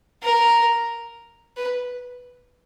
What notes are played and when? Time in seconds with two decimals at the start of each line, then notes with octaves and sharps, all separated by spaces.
0.23 A#4
1.57 B4